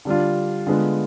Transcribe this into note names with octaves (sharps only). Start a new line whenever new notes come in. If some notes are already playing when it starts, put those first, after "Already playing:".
D3 G3 D4 F4
D3 G#3 B3 F4